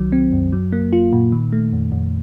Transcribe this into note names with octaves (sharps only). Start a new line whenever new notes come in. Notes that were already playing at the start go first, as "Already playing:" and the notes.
Already playing: C2 D#3 F#3
C4
F#2
F#3
A#3
F4
A#2
D#3
A3
F2
F2